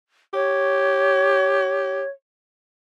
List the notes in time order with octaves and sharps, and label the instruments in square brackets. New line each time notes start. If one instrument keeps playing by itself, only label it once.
[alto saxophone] G4 [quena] C#5